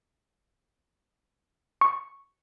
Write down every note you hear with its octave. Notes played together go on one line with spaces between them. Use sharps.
C#6